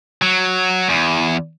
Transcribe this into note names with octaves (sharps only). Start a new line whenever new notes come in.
F#3
E2